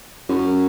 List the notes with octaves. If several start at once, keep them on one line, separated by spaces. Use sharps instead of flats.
F#2